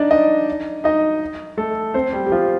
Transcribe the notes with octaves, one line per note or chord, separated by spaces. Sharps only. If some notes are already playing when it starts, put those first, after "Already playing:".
Already playing: D4 D#4 D5 D#5
D#4 D#5
D#4 D#5
A3 A4
C4 C5
G3 G4
G4
F3 F4